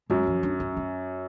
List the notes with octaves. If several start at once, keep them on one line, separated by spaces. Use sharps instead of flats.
F#2 G#3
F3
D4
C#4
C#4